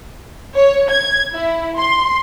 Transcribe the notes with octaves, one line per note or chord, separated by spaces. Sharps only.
C#5
G#6
E4
C6